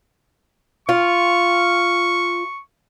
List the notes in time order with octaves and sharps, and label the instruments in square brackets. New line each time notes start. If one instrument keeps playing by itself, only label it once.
[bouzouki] F4 [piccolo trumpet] C#6